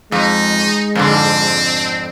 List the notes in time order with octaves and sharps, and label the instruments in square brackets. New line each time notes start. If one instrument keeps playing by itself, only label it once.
[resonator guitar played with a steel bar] F2 [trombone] G#3 [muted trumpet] D#4
[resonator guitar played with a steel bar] F2 G#2 D3 [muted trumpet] C4